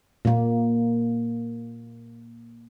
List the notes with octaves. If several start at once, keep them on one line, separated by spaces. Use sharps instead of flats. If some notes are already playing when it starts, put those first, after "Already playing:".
A#2 A#3